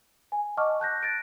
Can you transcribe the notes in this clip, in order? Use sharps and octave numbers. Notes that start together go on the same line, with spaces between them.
G#5
D#5 F#5 A5 C#6 D6 F6
A5 F#6 G6 A#6
F#6 A6 A#6 D7